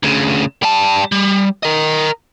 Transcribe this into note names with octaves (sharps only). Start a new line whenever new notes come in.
D2 C#3
G3 A5
G3
A#4 D#5